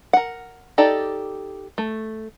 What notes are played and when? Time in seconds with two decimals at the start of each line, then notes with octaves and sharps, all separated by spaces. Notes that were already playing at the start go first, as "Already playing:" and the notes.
0.13 A#4 F#5
0.78 D#4 G4 A4 D5
1.78 A3